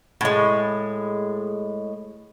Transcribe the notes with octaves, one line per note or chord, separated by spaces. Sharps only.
A2 G#3